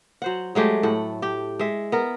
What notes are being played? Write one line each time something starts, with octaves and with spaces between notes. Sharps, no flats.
F#3 C5 F#5
F#3 G#3 A3 G4
A2 A4 F#5
G4
G#3 E5
B3 A#4